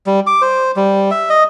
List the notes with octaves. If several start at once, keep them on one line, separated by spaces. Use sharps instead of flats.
G3
D6
C5
G3
E5
D#5